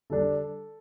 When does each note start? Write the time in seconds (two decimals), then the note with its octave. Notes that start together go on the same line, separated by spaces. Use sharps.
0.10 D3 G3 D4 A4